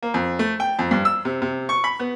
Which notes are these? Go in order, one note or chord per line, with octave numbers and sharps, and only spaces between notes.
A#3
F2
A3
G5
F2
G2
E6
C3
C3
C#6
B5
B3